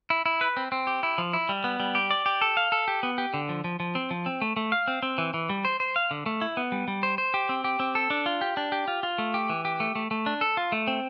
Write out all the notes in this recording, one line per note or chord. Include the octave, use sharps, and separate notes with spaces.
E4
E4
B4
C4
C4
G4
E4
F3
E4
G3
B3
G3
G4
D5
G4
A4
F5
A4
G4
B3
G4
D3
F3
F3
F3
C4
F3
C4
A3
A3
F5
C4
C4
E3
E3
G3
C5
C5
F5
D3
A3
E4
B3
G3
G3
C5
C5
G4
C4
G4
C4
A4
D4
F4
G4
D4
G4
F4
F4
A3
G4
E3
G4
A3
A3
A3
D4
A4
F4
A3
C4